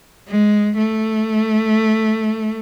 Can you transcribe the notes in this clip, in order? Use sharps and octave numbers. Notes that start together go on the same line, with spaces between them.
G#3
A3